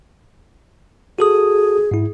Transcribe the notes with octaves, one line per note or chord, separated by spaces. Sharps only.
F#4 G#4 A4 D#6
G#2 E4